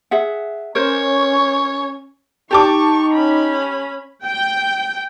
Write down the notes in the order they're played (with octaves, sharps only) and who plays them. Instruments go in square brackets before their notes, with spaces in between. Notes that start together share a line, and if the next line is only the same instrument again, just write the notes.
[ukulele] G#4 E5 F#5
[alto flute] C#4 [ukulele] A#4 C5 [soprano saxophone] C#5
[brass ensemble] D#4 [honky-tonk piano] G4 A5 D6 [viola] C#6
[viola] C#4 B5
[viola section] G5